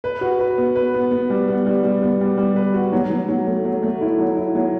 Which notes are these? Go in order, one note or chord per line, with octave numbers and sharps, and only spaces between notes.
B4
F#4
B4
B3
B4
B3
B3
G3
B3
G3
G3
B3
G3
G3
B4
F#4
F#3
F#3
F#3
A3
F#3
A3
E4
F#3
E4
F#3